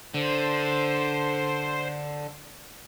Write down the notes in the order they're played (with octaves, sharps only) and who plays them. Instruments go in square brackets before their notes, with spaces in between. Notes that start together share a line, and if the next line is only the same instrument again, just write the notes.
[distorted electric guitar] D3 [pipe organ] C5